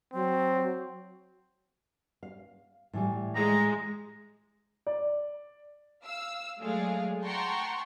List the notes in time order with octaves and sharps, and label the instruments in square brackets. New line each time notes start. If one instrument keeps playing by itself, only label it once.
[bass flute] F#3 [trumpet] C4
[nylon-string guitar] F5
A2 E3 G3
[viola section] G#3 [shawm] A#5
[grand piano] D5
[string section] F5 E6
F#3 G#3 A3 G#4 D5 F5
F#5 G5 A5 A#5 C6 C#6